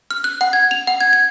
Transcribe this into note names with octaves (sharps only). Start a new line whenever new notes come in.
F6
F#6
F#5
G#6
F7
F#5
G#6
G#6